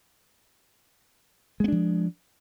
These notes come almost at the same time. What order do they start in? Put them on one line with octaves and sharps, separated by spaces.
G#3 B3 D4 F3